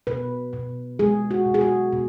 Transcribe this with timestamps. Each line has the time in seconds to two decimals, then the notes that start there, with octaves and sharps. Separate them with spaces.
0.07 B2 B4
0.53 B2
0.99 G#3 G#4
1.31 F#4
1.46 B2
1.54 G#4
1.61 F#4
1.93 B2